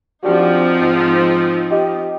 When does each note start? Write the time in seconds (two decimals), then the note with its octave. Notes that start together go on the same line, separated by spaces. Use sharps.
0.24 F3 C4 D4 D#4 F#4 G4
0.81 G#2
1.71 G4 D#5